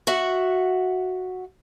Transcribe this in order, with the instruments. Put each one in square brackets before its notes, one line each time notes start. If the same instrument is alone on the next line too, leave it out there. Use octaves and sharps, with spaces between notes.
[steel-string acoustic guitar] F#4 E5 F#5